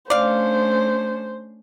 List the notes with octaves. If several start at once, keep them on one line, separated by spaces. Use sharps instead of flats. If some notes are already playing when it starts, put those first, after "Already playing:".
A3 C#4 D4 C5 D5 F5